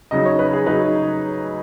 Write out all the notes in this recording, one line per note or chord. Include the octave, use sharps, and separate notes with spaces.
C#3 F#3 D#4 D#5
C#5
B4
G#4
C#3 F#3 D#4 B4